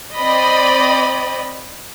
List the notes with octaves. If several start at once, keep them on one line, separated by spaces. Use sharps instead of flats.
C4 D5 D#5 B5